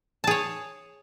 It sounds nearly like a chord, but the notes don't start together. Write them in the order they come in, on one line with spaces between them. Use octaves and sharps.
A5 G#4 C#5